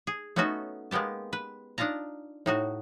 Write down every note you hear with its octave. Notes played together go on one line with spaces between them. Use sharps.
G#4
A3 B3 C#4 D#4 F#4 A4
G#3 A#3 B3 G4 A5
B4
D4 D#4 F4 A5 A#5
A2 D#4 F#4